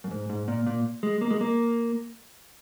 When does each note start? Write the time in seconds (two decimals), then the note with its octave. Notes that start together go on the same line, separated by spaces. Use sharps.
0.04 F#2
0.11 G#2
0.29 G#2
0.48 A#2
0.67 A#2
1.03 G#3
1.21 A#3
1.31 G#3
1.41 A#3